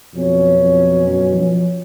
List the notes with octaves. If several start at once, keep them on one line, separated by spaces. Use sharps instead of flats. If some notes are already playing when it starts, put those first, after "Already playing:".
F2 B2 F#3 C#4
F2
F#2
F3